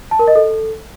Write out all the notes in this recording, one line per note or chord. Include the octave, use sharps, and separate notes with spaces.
A5
A#4
D#5
A4